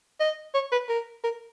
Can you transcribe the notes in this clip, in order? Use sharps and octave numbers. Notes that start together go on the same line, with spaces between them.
D#5
C#5
B4
A#4
A#4